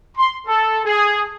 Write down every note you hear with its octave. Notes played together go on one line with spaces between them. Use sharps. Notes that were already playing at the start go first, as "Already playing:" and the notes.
C6
A4
G#4